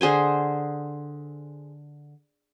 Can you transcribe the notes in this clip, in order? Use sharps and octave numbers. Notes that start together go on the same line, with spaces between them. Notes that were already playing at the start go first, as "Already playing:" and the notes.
D3 G#4 C5 G#5